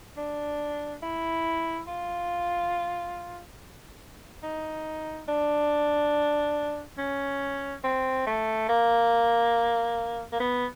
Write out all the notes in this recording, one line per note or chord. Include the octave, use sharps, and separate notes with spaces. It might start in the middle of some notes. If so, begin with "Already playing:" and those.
D4
E4
F4
D#4
D4
C#4
C4
A3
A#3
A#3
B3